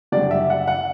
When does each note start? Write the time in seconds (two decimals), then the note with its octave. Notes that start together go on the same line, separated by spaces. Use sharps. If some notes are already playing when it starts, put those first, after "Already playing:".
0.12 F#1 F#2 D3 G3 D4 D5
0.31 E5
0.50 F#5
0.68 F#5